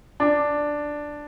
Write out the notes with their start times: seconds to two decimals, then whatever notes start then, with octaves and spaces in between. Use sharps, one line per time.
0.20 D4